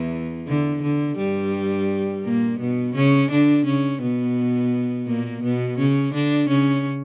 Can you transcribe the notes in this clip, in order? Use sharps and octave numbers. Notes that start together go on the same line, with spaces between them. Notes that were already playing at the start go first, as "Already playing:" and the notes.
Already playing: E2 E3
D3
D3
G2 G3
A#2 A#3
B2 B3
C#3 C#4
D3 D4
C#3 C#4
B2 B3
A#2 A#3
B2 B3
C#3 C#4
D3 D4
C#3 C#4